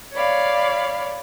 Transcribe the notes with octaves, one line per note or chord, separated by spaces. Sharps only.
C#5 D5 F5 B5